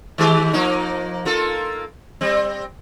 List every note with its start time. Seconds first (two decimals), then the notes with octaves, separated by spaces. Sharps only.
0.18 D#3 G#3 G4
0.53 F3 A#3 D#4
1.25 A#3 F4 A4
2.21 G3 C4